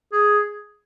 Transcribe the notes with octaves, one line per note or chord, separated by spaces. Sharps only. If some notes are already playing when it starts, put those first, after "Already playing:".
G#4